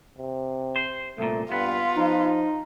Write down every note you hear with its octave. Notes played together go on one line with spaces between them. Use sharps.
C3
C5
C2 A#2 A3
G2 B3 F4
F3 D#4